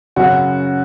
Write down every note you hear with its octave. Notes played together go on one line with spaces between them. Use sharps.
F#2 C#3 F#3 F#4